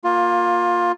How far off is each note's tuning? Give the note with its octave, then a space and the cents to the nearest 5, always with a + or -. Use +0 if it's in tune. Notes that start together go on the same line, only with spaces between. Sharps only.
A#3 +0 F4 +20